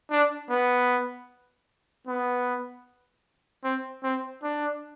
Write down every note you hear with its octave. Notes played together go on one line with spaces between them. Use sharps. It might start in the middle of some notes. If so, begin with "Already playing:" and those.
D4
B3
B3
C4
C4
D4